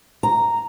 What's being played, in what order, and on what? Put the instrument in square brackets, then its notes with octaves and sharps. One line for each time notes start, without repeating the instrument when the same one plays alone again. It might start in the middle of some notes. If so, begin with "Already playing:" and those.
[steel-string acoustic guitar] A#5